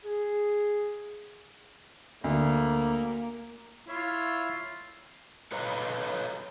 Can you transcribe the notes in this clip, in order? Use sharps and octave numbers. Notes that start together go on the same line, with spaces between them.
G#4
D2 A#3
E4 F4 C#5 E5
A4 B4 C#5 D#5 F5 A#5